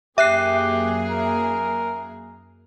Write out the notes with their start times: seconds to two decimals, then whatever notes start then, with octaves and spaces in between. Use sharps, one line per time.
0.18 F#2 A#3 G4 G#4 E5 F#6 C7
1.10 A#4